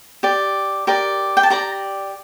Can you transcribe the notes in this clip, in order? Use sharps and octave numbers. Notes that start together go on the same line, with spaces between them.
G4 D5
G4 A#4 D5
G5
A5
G4 D5 A#5